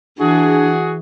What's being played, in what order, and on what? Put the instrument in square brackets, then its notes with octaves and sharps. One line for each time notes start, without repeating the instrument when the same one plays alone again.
[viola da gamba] E3 [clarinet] D4 [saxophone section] F#4 G#4